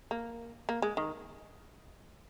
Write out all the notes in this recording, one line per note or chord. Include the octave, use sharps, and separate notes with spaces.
A#3
A#3
G#3
D#3